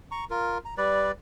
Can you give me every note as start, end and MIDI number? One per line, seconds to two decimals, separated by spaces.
0.11 0.25 82
0.11 0.25 85
0.30 0.58 65
0.30 0.58 70
0.65 0.75 82
0.77 1.12 55
0.77 1.12 71
0.77 1.12 74